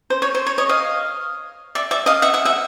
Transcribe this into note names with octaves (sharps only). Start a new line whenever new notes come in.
C5
C#5
C5
C#5
C#5 D#5
D#5 F5
D5 E5
D5 E5
D#5 F5
E5 F#5
E5 F#5
E5 F#5